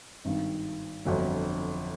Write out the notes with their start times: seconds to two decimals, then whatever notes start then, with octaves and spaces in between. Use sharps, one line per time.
0.25 G#1 G2 D#3
1.05 G1 F2 D3 F#3